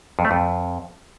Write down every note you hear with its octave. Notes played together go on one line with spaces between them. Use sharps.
F2
A3
F2